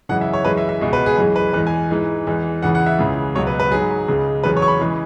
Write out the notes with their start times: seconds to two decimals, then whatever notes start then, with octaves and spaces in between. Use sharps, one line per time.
0.09 F#2 C#3 E3 G#3 F#5
0.21 E5
0.33 C#5
0.45 F#2 E3 G#3 B4
0.57 E5
0.69 E5
0.81 C#2 B2 G#3 G#4
0.93 B4
1.06 G#4
1.17 F#2 E3 G#3 G#4
1.36 B4
1.53 E2 E3 G#3 B4
1.67 G#5
1.90 G#2 E3 G#3
2.27 E2 E3 G#3
2.63 E2 C#3 E3 G#3 F#5
2.75 F#5
2.86 E5
2.99 C#2 C#3 E3
3.35 C#2 B2 F#3 C#5
3.47 B4
3.60 B4
3.71 G#2 F#3 G#4
4.08 C#2 C#3 G#3
4.43 E2 C#3 F#3 B4
4.57 C#5
4.62 C#6
4.68 B5
4.81 C#3 E3 G#3